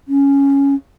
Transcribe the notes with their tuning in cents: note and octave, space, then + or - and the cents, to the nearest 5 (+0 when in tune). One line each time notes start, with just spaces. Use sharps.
C#4 +5